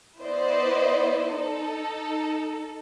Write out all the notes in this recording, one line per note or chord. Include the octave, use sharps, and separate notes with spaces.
B3 E4 B4 C5 D5 D#5
D#4 A4